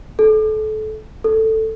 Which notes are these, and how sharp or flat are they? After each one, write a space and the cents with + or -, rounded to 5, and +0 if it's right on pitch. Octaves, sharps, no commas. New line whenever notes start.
A4 -30
A4 +10